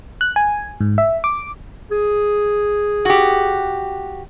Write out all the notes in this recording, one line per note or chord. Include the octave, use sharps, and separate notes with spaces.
F#6
G#5
G#2
E5
D6
G#4
F#4 G4